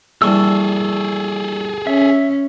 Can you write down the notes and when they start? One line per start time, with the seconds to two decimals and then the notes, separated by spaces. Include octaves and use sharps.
0.22 A#1 E3 G3 G#4 A4 A5 C#6 E6
1.87 C#4 E5